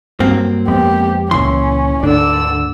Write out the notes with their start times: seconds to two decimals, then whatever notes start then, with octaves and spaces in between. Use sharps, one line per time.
0.20 G2 F#3 A#3 C4
0.68 F2 G#3 B3 G4
1.31 C#2 A#2 E3 C#4 C6
2.03 D2 G#2 D3 D4 D5 E6